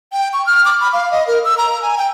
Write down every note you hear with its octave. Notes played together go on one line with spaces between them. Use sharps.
G5
C#6
F6
D6
B5
F5
D#5
A#4
E6
A#5
G#5
G5